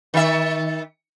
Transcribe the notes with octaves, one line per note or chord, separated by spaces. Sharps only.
D#3 E5